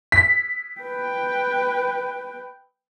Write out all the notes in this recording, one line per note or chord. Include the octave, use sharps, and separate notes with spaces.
B6
B4 G5